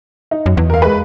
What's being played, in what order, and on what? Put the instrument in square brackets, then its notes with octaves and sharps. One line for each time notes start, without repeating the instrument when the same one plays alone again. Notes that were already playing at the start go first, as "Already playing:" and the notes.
[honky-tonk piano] D#4
[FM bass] F#2
E2
[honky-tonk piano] A#4 F5
G#3 B4